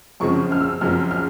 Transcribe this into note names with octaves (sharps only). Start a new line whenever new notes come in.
F#2 C#3 F3 G#3 C4 C#6
F6
E6
F#2 C#3 F3 G#3 C4 F6
F6